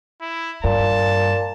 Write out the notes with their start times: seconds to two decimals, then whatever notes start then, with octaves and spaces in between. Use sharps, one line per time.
0.21 E4
0.64 G2 A#2 A5